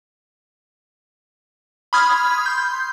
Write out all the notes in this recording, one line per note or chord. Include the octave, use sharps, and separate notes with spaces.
B5 C6 D#6 F6 G#6
C6 G6